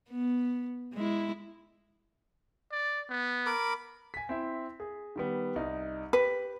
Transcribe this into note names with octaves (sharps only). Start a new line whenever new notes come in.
B3
G#3 E4
D5
B3
A#4 B5 D6
G#5 B6
C4 E4 E5
G#4
D#3 G3 B3
C2 D#4
G4 B4